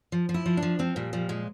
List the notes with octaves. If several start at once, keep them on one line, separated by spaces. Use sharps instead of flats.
F3
F3
E4
F3
D4
F3
F3 C4
A#2 G3
F3 G3
A#2 G#3